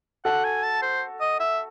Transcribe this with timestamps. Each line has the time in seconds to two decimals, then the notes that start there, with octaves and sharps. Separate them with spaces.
0.25 F#4 A4 F#5
0.44 G#5
0.63 A5
0.82 C5
1.21 D#5
1.40 E5